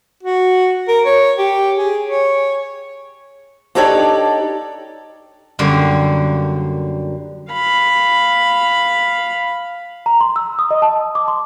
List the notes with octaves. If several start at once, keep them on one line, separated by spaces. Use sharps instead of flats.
F#4
A#4
C#5
G4
G#4
C#5
D4 D#4 G4 A4 C#5 D5
F#2 D3 G3 A#3 C5
F5 B5
A#5
C6
E6
D#6
D#5
A5
D6
C6